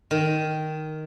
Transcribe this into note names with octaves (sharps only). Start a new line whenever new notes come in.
D#3